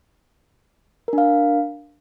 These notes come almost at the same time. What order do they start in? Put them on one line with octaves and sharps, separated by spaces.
A#4 D4 F5